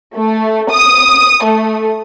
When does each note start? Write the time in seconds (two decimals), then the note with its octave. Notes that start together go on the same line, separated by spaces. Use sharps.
0.14 A3
0.71 D#6
1.44 A3